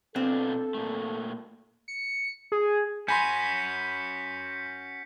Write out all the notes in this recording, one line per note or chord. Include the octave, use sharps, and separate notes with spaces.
B2 C4 D4 F4 A4
A#2 A3
C#7
G#4
C#4 F#4 G#5 B5 C6 G6 B6 C#7